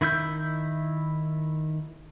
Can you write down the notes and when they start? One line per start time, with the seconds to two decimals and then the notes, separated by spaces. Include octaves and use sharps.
0.01 D#3 E4 E5 G6